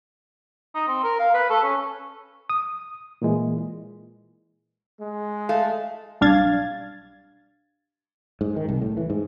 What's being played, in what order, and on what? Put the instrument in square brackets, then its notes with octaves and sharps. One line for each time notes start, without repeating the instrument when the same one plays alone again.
[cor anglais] D#4
C4
A#4
F5
B4
A4
C#4
[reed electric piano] D#6
A#2 E3 G#3
[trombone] G#3
[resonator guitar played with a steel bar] A3 F5
[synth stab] B1 G3 D4 F5 G#6 A6
[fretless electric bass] G#2
D#3
C2
A2
E3
G#2